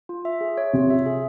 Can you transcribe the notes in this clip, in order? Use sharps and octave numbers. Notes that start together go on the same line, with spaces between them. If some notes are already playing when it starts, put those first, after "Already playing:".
F4
E5
G#4
C#5
C3 F4
E5
G#4